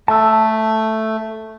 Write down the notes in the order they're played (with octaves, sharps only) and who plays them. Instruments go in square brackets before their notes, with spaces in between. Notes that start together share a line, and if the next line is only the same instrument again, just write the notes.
[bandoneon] A3 [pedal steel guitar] A5 E6